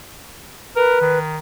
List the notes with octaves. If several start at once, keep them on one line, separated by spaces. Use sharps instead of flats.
A#4 B4
D#3